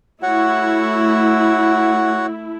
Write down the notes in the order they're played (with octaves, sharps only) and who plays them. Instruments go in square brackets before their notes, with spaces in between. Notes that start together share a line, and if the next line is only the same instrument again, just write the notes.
[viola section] A3 E4 [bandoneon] F#4 C#5 F#5